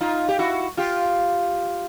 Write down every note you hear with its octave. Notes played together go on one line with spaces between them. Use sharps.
D#4 F4
G4
E4 F#4
F4 G4